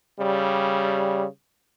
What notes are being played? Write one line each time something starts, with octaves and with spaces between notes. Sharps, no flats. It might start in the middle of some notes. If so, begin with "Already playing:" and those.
C#3 G3